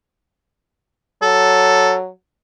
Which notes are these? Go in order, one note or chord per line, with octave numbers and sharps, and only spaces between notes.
F#3 A4